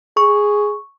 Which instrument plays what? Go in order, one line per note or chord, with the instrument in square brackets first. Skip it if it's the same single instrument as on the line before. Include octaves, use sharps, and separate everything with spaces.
[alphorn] G#4 [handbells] C#6